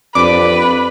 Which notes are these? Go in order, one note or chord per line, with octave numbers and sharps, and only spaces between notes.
F2 D4 G4 B4 D6